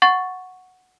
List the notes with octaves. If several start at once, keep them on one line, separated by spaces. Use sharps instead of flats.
F#5 C#6 A6